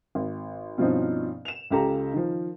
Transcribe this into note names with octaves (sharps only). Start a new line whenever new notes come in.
G#1
G2 B2 F3 C4 C#4 D#4
E7 F7
C#2 C#3 G4 A4 A#5
D#3 F3